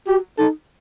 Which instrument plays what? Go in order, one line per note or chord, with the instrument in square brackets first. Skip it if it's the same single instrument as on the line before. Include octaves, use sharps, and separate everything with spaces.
[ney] F#4 [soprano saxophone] G4
[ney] D#4 [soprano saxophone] A4